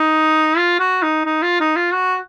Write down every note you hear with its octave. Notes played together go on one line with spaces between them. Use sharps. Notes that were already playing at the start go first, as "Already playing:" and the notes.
Already playing: D#4
F4
F#4
D#4
D#4
F4
D#4
F4
F#4